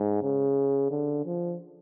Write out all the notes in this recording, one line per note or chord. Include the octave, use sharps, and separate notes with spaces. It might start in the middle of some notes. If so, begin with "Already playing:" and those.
Already playing: G#2
C#3
D3
F3